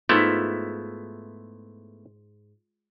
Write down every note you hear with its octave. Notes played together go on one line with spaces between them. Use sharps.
G#2 A3 B3 E4 F4